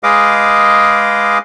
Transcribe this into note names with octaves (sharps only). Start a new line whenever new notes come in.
G#3 G#4 B4 D#5 F5 D6